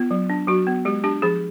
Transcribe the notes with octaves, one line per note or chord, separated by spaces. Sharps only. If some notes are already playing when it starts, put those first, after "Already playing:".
Already playing: B3 F4
F#3
D4
F#3 F#4
B3
G#3 G4
D4 G4
F3 G#4